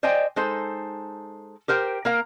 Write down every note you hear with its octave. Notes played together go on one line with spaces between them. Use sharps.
C5 D5 D#5 G5 G#5
G#3 D#4 A4 C5
G4 A#4 C5 G5
A#3 A#4 F5